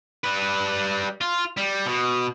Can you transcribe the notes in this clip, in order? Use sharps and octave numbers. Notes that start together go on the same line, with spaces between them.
G3 B4
F4
G3
B2